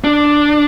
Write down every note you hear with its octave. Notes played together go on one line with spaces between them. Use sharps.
D4